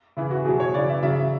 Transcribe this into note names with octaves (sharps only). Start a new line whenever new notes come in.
C#3 E3 E4
F#4
B2 F#3 G#4
C#5
C#3 E3 D5
E5
C#3 F#3 E5